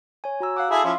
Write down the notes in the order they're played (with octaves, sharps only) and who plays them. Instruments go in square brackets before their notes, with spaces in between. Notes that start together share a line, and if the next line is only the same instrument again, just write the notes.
[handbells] C#5 G#5
F#4 A#5 E6
[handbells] F5 D6 [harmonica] F#5
[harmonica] E4 G#4 A4 [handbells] B5
[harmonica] F3 C#4 E4 [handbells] F5 C6